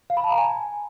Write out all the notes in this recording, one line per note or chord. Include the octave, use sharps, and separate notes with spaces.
F5
B5
A5
A#5
G#5